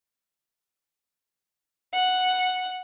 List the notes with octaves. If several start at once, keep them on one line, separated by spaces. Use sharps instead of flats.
F#5